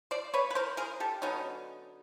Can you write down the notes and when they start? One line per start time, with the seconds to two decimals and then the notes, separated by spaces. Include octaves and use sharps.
0.11 C5 D5
0.34 B4 C#5
0.50 B4
0.55 A#4 C5
0.77 G#4 A#4
1.00 G4 A4
1.22 D3 F#3 B3 C#4 D#4